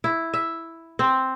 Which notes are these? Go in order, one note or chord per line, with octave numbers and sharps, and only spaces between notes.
E4
E5
C4